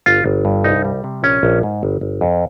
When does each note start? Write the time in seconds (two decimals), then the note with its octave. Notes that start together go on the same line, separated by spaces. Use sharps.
0.06 G1 F4
0.26 G1
0.45 G2
0.64 C2 D#4
0.85 G3
1.04 C3
1.23 A#1 C#4
1.43 A#1
1.63 G#2
1.83 G1
2.01 G1
2.21 F2